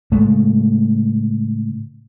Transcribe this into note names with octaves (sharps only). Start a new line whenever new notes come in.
A2 C#3 G#3 A3